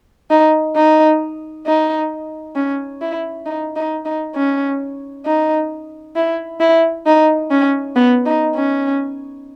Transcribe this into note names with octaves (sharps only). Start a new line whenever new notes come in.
D#4
D#4
D#4
C#4
E4
D#4
D#4
D#4
C#4
D#4
E4
E4
D#4
C#4
B3
D#4
C#4